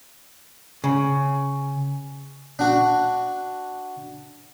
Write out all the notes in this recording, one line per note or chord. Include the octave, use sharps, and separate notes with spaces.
C#3
D4 F#4